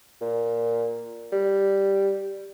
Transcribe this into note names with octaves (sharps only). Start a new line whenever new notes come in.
A#2
G3